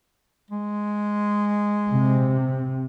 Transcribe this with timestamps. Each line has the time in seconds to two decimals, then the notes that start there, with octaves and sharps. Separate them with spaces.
0.51 G#3
1.88 C3